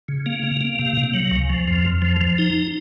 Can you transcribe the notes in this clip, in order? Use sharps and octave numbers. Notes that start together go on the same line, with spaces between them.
C#3
A#3
A#3
A#3
C3
C3
F#3
C#2
F3
F2
F2
F3
F3
D#4